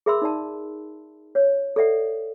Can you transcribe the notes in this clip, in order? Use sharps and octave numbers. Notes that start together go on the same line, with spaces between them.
G#4 A#4 E5 B5 C6 E6
D#4 D5 A5
C#5
A4 D5 E5 F#5